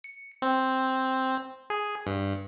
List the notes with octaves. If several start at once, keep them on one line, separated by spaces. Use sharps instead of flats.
C#7
C4
G#4
G2